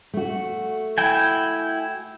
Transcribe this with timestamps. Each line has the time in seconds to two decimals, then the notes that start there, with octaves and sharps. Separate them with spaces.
0.14 A3 F#4
0.98 E4 G5 G#5